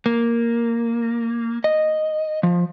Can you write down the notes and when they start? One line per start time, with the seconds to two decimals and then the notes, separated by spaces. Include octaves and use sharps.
0.06 A#3
1.64 D#5
2.43 F3